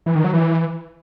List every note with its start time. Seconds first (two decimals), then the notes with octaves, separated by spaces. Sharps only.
0.06 E3
0.15 D#3
0.24 F#3
0.33 E3